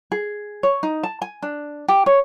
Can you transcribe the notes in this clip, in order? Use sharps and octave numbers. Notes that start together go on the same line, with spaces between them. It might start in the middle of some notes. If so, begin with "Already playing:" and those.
G#4
C#5
D#4
A5
G#5
D4
G4
C#5